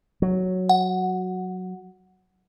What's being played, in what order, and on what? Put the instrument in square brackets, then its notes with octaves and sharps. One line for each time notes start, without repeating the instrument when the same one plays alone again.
[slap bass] F#3
[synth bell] F#5